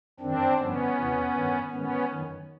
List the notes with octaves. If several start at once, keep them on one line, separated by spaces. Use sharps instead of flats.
F#2 D#3 C4 D4
G2 D3 F3 B3 C#4
E2 C3 E3
G2 D#3
G#2 D#3 B3 C#4
F#2 D#3